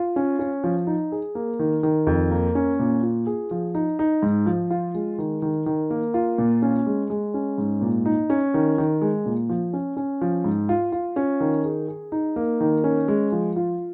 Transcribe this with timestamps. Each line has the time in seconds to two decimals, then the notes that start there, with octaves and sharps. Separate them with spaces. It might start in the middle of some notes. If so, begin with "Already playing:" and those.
Already playing: F4
0.16 C#4
0.39 C#4
0.64 F3
0.87 D#4
1.12 G#4
1.35 A#3
1.59 D#3
1.83 D#3
2.07 F2
2.31 A#3
2.55 C#4
2.79 A#2
3.03 F4
3.27 G#4
3.51 F3
3.75 D#4
3.99 D#4
4.22 G#2
4.46 F3
4.71 F4
4.95 G#3
5.18 D#3
5.42 D#3
5.66 D#3
5.90 A#3
6.14 F4
6.38 A#2
6.62 C#4
6.87 G#3
7.10 G#3
7.34 C#4
7.58 G#2
7.81 A#2
8.06 D#4
8.30 C#4
8.54 D#3
8.78 D#3
9.02 G#3
9.26 A#2
9.49 F3
9.73 C#4
9.97 C#4
10.21 F3
10.44 G#2
10.69 F4
10.92 F4
11.16 C#4
11.40 D#3
11.65 G#4
11.88 G#4
12.12 D#4
12.36 A#3
12.60 D#3
12.84 C#4
13.08 G#3
13.32 F3
13.56 F4